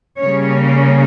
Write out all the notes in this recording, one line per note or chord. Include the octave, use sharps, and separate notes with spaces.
C#3 G3 A#3 C#4 C#5